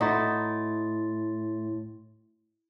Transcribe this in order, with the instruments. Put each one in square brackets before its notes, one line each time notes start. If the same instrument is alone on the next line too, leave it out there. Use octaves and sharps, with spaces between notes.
[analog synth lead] A2 [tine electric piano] A3 C6 A6 [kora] D#4 E4 F#4